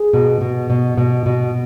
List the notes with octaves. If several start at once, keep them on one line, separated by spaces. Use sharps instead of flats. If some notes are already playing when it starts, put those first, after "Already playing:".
Already playing: G#4
B2
B2
B2
B2
B2